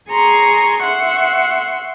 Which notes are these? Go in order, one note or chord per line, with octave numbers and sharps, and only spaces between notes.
G#4 G#5 A#5 C6 C#6
E5 F#5 C6 C#6